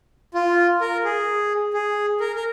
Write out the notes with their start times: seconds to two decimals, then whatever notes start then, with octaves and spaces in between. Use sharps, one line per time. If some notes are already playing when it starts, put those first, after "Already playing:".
0.34 F4
0.81 A#4
1.04 G#4
1.74 G#4
2.20 A#4
2.36 A#4